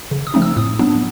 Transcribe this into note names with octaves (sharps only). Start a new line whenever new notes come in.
C#3
D#6
F3 A3 C4 D#4
E6
A2 D#6
F#3 B3 D4